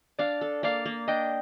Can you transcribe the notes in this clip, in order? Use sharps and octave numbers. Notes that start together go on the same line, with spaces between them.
D4 D5 F5
A4
A#3 D5 F5
A#3
D4 D#5 G5